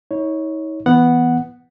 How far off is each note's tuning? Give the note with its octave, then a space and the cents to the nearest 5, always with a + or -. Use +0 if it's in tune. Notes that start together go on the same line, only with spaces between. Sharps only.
D#4 +45 C#5 +0
E3 +0 B3 +0 F#5 +0